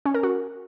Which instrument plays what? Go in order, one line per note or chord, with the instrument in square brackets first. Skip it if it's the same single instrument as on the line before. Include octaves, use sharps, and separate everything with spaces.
[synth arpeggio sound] C#4
A#4
F#4